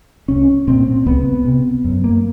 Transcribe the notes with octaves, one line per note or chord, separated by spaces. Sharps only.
C2 C#4
A#2 C4
C#2 B3
C3
F#2
A#3